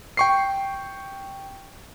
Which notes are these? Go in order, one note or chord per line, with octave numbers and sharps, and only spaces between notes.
G5 C#6 C7